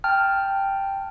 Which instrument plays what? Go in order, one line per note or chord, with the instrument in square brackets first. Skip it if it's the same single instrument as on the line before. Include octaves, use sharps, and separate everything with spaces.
[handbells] G5 A5 F6